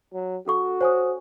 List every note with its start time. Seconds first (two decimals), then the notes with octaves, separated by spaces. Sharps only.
0.13 F#3
0.46 C#4 F#4 A4 C#6
0.81 C5 C#5 G#5 D#6